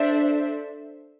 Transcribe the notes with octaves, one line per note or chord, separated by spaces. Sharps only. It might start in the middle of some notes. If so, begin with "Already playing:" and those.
Already playing: D4 A4 C5 E5